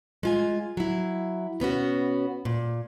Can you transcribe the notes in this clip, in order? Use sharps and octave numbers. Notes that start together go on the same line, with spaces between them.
G#3 F4 G#5
F#3 E4
B2 B3 C#4 F#4
A#2